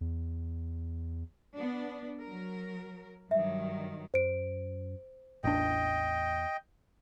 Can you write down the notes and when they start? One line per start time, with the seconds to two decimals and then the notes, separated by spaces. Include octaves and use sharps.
0.01 E2
1.54 B3 D4
2.21 F#3 A#4
3.31 G2 D#3 F#3 E5
4.14 F#2 C5 D7
5.44 A1 E2 D4 D#5 G5